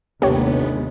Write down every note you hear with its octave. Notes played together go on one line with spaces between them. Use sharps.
G1 D#2 C3 G#3 B3 G4 C#5